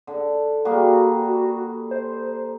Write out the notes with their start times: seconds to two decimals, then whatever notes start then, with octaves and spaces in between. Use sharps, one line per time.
0.07 D3
0.65 G3 A#3 F#4 G#4
1.91 C5